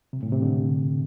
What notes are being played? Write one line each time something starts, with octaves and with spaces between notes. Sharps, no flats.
C3
A2
C3
D3